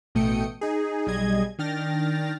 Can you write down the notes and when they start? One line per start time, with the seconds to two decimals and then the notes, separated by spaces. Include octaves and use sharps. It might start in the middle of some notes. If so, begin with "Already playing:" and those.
0.15 A1 B2 A3 G5 D#6 C#7
0.61 D#4 G#4
1.07 B1 G3 G#4 D#5 G#6
1.59 D#3 D4 G5 F6 A6 A#6